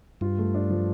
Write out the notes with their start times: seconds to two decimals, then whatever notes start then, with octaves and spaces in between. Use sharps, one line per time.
0.21 G2 F4
0.38 A3
0.55 D4
0.70 F3